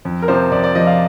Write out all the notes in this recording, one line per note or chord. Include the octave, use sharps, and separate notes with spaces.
F2
A#4
C3 F3 C5
F2 D5
D5
C3 F3 D#5
F5